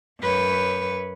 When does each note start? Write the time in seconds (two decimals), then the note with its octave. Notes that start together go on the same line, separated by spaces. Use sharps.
0.20 F#2 B4 C#5